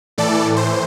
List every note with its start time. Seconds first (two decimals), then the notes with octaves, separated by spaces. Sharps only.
0.18 A2 E3 A4 D5
0.56 C5